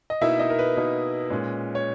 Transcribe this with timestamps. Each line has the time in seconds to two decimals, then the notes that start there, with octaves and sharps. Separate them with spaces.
0.10 D#5
0.21 B2 A#3 D#4 E4 E5
0.39 D#4 D#5
0.50 A#4
0.59 B4
0.77 B2 A#3 D#4
1.30 A#2 G#3 C#4
1.75 C#5